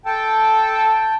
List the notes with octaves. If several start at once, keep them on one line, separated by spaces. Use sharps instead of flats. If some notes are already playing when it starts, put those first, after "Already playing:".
A4 G5 A5